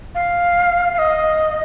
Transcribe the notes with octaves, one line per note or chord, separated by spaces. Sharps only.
F5
F5
D#5